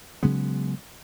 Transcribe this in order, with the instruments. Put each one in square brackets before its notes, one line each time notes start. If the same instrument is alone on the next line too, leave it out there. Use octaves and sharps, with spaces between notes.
[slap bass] C#3 F#3 G#3 B3